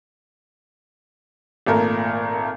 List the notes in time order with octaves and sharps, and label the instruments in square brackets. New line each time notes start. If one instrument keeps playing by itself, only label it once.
[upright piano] G#1 A#2 A3 A#4